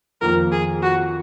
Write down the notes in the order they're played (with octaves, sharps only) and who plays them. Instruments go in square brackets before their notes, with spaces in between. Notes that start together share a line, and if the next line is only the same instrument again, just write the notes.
[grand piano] F2 D#3 A#3 [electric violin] A#4
[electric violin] G#4
F#4